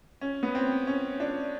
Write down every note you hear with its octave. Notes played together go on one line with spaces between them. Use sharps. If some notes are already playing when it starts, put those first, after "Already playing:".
C#4
B3
C4
C#4
D4